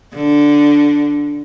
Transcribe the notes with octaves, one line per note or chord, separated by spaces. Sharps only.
D3